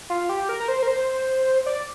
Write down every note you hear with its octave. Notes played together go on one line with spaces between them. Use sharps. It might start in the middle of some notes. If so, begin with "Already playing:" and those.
F4
G4
A#4
A#4
C5
A#4
C5
D5